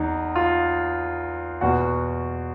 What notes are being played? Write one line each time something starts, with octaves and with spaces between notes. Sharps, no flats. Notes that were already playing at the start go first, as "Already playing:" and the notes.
Already playing: E2 D#4
F4
E2 B2 F#4